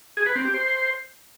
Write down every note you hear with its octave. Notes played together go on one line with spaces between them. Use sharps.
G#4
B4
C4
G4
C5